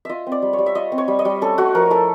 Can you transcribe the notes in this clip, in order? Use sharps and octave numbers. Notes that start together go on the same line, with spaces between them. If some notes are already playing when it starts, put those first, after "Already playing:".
F4 D#5 E5
C4
D5
G3
C#5
G3
E5
F4 D#5
C4
C#5
G3
D#5
G3
C#4 A4
A3 F#4
F3 A#4
E4 A4